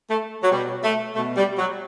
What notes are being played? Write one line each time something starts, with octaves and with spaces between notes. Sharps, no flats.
A3
F#3
B2 G3
A3
B2 A3
G3
F#3